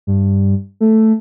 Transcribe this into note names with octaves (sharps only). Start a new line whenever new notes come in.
G2
A3